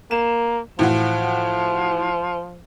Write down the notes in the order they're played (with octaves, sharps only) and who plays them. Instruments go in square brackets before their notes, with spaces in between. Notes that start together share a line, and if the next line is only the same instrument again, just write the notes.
[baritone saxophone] A#3 [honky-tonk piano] E7
[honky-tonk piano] A2 E3 F#4 [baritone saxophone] F3